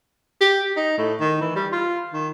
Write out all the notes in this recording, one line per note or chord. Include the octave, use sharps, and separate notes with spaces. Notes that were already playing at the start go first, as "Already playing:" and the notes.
G4
D#4
A2
D#3
E3
G3
F4
D#3